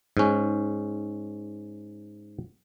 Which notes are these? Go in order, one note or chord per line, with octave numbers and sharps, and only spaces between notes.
G#2 C#4